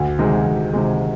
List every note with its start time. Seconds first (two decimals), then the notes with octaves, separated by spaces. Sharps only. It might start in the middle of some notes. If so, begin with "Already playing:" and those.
Already playing: D2
0.19 C3 D#3 G#3
0.46 D2
0.73 C3 D#3 G#3